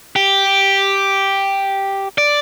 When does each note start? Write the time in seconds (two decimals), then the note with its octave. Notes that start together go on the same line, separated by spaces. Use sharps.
0.16 G4
2.18 D5